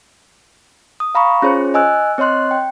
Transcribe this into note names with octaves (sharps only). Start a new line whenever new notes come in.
D#6
F5 A#5 B5 C#6
C#4 F4 G#4 C5 C#5
D#5 G#5 E6 F#6
C4 C#5 D#5 C6 F#6
G5